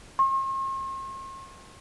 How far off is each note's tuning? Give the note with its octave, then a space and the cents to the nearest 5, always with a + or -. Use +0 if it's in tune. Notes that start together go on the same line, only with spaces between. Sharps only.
C6 +45